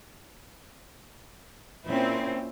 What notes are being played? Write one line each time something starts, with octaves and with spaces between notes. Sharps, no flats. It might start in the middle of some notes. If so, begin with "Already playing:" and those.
A#2 C4 C#4 E4